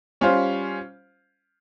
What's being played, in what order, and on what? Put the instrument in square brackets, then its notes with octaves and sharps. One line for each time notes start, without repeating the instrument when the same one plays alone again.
[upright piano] G3 C#4 F4 C5 F5